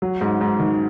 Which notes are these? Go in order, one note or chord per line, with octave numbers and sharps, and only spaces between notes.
F#3
G#2
G#2
D#3